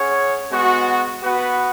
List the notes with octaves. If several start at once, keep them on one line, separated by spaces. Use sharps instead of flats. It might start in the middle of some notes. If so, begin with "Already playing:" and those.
Already playing: C#4 G#4 C#5 F#5
G#3 B3 F#4
B3 F#4 B4 F#5